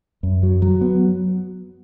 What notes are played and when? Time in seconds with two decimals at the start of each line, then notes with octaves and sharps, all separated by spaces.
0.23 F#2
0.43 F#3
0.62 F#3
0.81 B3